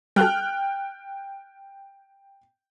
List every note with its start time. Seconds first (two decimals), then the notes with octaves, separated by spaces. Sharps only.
0.16 G3 F#4 A4 G5 F6 F#6